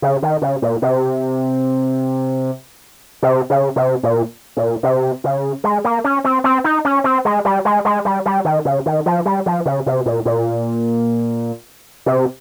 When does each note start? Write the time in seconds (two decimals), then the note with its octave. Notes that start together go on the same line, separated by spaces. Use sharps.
0.02 C#3
0.23 D#3
0.42 C#3
0.62 A#2
0.82 C3
3.23 C3
3.50 C#3
3.76 C3
4.03 A#2
4.57 A#2
4.83 C3
5.24 C#3
5.64 G#3
5.84 A#3
6.04 C#4
6.24 C4
6.44 C4
6.64 D#4
6.85 C#4
7.04 C4
7.25 G#3
7.45 G3
7.65 G#3
7.85 G#3
8.05 G3
8.26 G3
8.45 D#3
8.65 C#3
8.86 D#3
9.06 F3
9.25 G3
9.46 F3
9.66 C#3
9.86 C3
10.06 A#2
10.25 A#2
12.06 C3